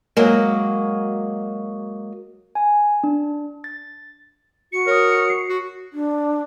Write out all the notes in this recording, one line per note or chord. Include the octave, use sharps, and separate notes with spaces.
F#3 G#3 A#3
G#5
D4
A6
F#4 C#7
A#4 C#5 D#6
C7
F#4
D4